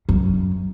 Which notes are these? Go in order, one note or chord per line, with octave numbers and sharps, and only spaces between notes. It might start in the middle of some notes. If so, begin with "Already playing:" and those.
F#2